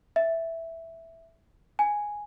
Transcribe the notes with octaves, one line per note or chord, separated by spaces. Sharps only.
E5
G#5